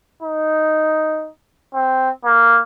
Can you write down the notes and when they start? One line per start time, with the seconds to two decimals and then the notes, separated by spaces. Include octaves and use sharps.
0.23 D#4
1.75 C4
2.25 A#3